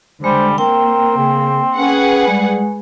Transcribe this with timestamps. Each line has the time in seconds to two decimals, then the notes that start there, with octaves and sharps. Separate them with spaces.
0.24 D3 G3 G#3 C5
0.58 A#3 C4 A#4 G5
1.17 C#3
1.77 C#4 G#4 B4 F#5
2.28 G3 G#3